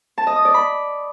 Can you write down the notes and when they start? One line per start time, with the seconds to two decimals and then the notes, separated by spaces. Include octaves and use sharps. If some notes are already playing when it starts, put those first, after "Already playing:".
0.18 A5
0.27 D#5
0.36 D#6
0.45 D5
0.54 B5